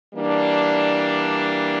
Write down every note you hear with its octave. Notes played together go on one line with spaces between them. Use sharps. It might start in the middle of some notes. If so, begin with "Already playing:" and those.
E3 G3 A#3 D4